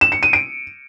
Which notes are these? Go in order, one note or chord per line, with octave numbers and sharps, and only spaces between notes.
E7
C#7
D#7
D7